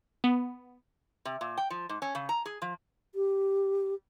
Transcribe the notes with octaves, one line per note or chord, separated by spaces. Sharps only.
B3
C3
A#2
G5
F3
G#2
C#4
C#3
A#5
G#4
F3
G4